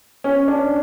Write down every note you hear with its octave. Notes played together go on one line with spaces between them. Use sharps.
C#4
D4